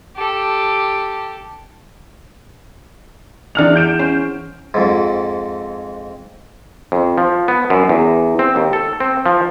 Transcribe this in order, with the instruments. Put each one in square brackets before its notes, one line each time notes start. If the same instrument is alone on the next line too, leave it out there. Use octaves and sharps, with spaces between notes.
[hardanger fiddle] G4 A4
[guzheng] E2 F#5 [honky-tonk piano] D4 F6 F7
[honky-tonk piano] G6 D7 E7
[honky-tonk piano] C#4 [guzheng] C5
[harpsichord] F2 G#2
[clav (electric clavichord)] F2
F3
B3
F#2
E2
C4
D#2
A4
C4
F3